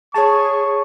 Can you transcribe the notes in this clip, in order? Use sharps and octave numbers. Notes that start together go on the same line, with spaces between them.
G#4 C#5 A5 C#6